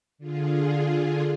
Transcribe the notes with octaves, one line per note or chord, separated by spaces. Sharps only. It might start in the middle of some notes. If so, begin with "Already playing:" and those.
D3 F4 G#4